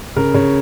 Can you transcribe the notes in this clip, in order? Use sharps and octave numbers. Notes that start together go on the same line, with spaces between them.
C#3 A#4
C#3 C#5